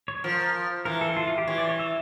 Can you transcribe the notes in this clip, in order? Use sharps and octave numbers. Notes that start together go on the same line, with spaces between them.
C#5
F3 A#4
E3 A#4
A4
F4
F4
G4
E3 C#5
D5
C#5
E5